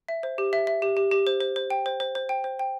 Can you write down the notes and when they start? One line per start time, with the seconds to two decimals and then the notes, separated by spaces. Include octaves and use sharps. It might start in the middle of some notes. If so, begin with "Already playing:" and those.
0.08 E5
0.23 C5
0.38 G4
0.53 E5
0.67 E5
0.82 G4
0.97 G4
1.11 G4
1.27 C5
1.41 C5
1.56 C5
1.70 G5
1.86 C5
2.00 C5
2.15 C5
2.29 G5
2.44 C5
2.59 G5